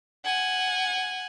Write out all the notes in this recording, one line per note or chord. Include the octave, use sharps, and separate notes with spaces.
F#5 G#5